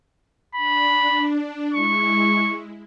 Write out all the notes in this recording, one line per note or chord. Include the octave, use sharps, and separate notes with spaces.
D4 B5
G#3 E4 C#6